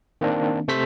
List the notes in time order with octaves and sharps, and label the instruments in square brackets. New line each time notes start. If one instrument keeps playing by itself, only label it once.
[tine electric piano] D#3 A#3 C4 D4
C3 A3 C5 E5 B6